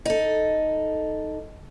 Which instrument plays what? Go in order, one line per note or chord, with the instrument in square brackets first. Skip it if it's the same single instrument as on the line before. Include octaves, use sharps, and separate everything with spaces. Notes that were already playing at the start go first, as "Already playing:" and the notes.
[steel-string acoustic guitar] D#4 A4